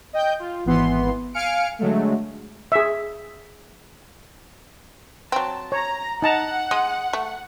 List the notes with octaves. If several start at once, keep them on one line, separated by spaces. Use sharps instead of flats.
D#5 G5 G6
F4
G#1 E3 B3 C6
F5 G#5 F6 C#7 D7
D3 F#3 G#3 A3
G#4 E5
F#3 C4 A5
C#5 A#5
D#4 F#5 A5 A#5
G#3 D#6
A3